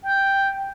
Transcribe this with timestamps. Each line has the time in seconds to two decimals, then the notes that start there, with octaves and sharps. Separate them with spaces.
0.03 G5